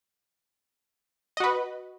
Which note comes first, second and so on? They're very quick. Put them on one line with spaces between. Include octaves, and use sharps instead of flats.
D#5 F#4 B4